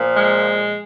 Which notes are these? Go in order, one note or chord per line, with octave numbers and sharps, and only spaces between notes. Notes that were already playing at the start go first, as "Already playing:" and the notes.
Already playing: A#2 F3
G#3